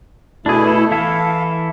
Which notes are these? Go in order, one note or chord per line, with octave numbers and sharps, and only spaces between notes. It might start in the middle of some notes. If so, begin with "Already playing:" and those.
B2 A3 D4 E4 G#4
A4
E3 E4 A4 F5